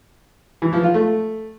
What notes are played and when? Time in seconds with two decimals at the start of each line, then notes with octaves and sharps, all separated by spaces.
0.62 E3
0.73 F3
0.84 F4
0.94 A3